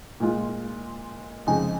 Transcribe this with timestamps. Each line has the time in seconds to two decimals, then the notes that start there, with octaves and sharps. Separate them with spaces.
0.20 A#2 G#3 F4
1.47 F2 C#3 G#3 D#4 G#5